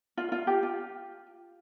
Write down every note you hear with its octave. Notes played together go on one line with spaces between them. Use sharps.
F4
F4
G4
F4